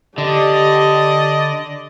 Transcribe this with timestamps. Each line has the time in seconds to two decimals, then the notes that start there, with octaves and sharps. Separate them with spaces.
0.18 D3 G4 D5 D#5